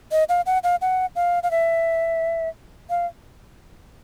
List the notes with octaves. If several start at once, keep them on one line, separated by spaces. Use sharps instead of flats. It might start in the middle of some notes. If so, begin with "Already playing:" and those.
D#5
F5
F#5
F5
F#5
F5
F5
E5
F5